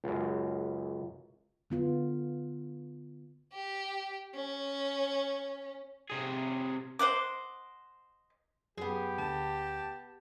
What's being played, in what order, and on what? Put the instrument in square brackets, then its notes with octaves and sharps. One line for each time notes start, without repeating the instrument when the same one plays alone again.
[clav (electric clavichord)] C#2 F#2
[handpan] D3 B3 F4
[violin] G4
C#4
[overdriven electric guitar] C3 G#4
[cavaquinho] C5 D#5 F#5 D6
[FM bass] F#2 [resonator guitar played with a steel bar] B3 G#4 [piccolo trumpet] G4
[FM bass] D2 [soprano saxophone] A5